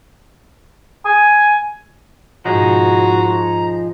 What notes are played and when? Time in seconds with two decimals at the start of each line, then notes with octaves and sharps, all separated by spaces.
1.05 G#5
2.45 G#2 B2 F3 D#4 F#4 G#4 A#5